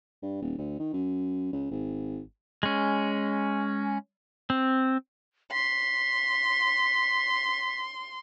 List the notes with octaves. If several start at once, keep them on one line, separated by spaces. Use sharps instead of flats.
G2
D#1
D2
D#3
F#2
C#2
G#1
G#3 C#4
C4
C6 B6